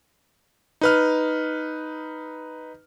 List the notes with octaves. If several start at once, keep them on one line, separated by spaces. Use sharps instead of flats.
D#4 B4 F6